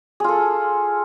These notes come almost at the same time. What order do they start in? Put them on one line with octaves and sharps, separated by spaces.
G#4 F4 A4